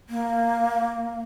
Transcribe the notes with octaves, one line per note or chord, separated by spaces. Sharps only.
A#3